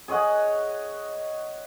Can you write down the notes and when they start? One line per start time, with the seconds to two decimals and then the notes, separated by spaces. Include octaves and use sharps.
0.08 G#4 C#5 D#5 F#5